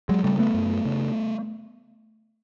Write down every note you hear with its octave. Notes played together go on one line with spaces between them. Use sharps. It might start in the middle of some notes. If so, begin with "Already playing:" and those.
F#3 G#3
C#3 G3 A3
A3 B3
F#2
C#3